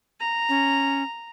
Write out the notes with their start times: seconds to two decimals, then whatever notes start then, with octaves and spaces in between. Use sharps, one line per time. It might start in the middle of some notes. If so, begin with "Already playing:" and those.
0.20 A#5
0.49 C#4